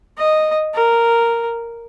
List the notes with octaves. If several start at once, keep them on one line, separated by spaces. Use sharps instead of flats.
D#5
A#4